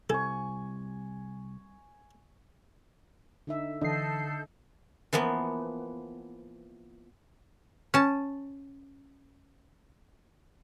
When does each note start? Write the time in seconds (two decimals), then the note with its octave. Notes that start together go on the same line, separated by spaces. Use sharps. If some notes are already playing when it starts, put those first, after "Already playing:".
0.10 C2 G3 C4 A4 G#5 C#6
3.47 D3 D#4 E5
3.81 D3 E3 D4 A4 D#5 G6 C7
5.13 E3 F3 A#3 B3
7.94 C#4 A5